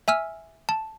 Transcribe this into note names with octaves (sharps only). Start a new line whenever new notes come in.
E5 G#5 E6 F6
A5